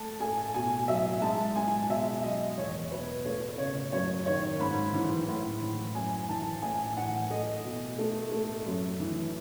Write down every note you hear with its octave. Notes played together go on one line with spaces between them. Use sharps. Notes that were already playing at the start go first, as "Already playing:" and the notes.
Already playing: A3 A5
A3 G#5
B2 G#5
F#3 E5
G#3 A5
G#3 G#5
B2 E5
F#3 D#5
E2 C#5
B2 B4
A3 C#5
C#3 C#5
F#2 C#5
D#3 C#5
G#2 B5
E3
A2
E3
F#2 G#5
E3 A5
A2 G#5
E3 F#5
A3 D#5
B2
A3
A3
F#2
E3